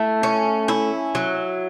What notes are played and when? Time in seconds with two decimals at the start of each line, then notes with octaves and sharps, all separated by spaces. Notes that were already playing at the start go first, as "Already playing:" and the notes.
Already playing: A3 E4
0.23 C#4
0.68 E4
1.15 F#3